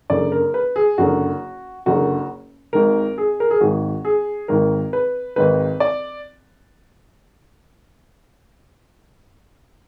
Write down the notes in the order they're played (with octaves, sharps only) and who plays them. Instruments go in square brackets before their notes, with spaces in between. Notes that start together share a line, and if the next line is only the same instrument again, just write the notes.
[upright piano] F#1 F#2 D3 D5
A#4
B4
G#4
F#1 F#2 D3 F#4
F#1 F#2 D3 F#4
G#1 G#2 D#3 A#4
G#4
A#4
G#4
G#1 G#2 D#3 F#4
G#4
G#1 G#2 D#3 A#4
B4
G#1 G#2 D#3 B4
D5